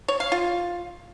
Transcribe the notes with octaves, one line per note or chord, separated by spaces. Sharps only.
C#5
F5
F4